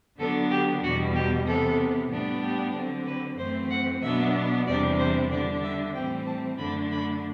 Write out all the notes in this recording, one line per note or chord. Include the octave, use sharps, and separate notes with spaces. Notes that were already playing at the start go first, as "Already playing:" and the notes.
D3 F#3 B3 D4 A4
G4
E2 B2 G3 F#4
G4
C3 E3 B3 A4
A2 G3 B3 D4
G4
D3 F#3 C4
B4
F#2 E3 A3 C4 C5
F#5
B2 F#3 B3 D4 E5
E2 C3 E3 G3 D4 D5
C5
D3 G3 D4 D5
E5
A2 E3 G3 C4 G5
A5
F#2 D3 A3 D4 B5
B5